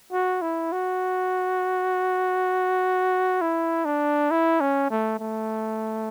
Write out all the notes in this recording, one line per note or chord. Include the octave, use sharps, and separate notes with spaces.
F#4
E4
F#4
E4
D4
E4
C#4
A3
A3